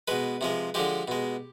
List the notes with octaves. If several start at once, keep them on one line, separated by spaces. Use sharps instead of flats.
B2 G#3 B4
C3 F3 G#3
D3 F3 G#3 G4
B2 G#3